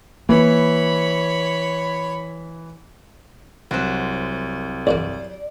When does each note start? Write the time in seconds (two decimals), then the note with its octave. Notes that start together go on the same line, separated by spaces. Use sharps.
0.29 E3 A#3 C#5 B5
3.71 C2 F#3 C5
4.87 E2 G2 A#3 D5